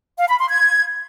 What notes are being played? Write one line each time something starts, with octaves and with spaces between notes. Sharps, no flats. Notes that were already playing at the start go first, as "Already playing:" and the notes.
F5
B5
C6
G#6